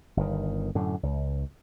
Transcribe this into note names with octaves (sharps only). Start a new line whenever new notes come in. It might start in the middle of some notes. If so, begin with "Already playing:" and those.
G1 D#3
F#2 A2 D3
C#2